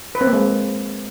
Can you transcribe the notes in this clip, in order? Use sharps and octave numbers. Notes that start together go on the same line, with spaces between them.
B4
C4
A#3
G#3